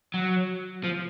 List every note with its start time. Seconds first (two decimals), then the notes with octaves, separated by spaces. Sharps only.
0.14 F#3
0.84 F3